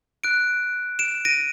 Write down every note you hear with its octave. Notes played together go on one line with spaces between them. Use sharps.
F#6 D7
D7 E7
A#6 D7 D#7